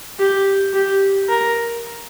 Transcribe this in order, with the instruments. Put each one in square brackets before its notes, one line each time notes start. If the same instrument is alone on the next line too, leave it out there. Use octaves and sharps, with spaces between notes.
[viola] G4
G4
A#4